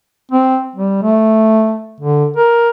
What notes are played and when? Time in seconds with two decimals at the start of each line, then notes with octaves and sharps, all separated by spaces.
0.31 C4
0.76 G3
1.03 A3
2.00 D3
2.36 A#4